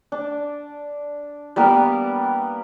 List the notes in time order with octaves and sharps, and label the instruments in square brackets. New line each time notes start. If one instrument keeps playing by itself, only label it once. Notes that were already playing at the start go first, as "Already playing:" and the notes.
[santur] D4
G3 A#3 B3 A#4